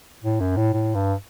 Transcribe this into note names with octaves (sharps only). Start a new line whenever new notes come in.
A2
F#2
A2
A2
G2